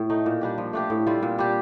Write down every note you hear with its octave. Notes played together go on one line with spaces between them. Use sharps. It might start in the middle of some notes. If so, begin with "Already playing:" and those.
Already playing: A2
A3 D#4
A#2
G3 D4 G4
F3
A3 D4 G4
A2
G3 C4 F4
A#2
G3 D4 G4